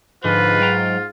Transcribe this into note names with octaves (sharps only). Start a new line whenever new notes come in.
G#2 D3 F3 F4 B4
F#3 G5 A#5